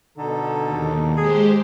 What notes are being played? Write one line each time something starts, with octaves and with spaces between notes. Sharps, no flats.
B2 D3 D#4 A4
D#2
G#3 G4 G#4 C5